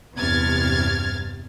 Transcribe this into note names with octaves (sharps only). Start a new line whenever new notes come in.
E2 G2 C3 F6 G#6 A6